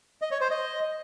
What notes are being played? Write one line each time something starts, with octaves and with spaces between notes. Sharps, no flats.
D#5
C#5
C5
D#5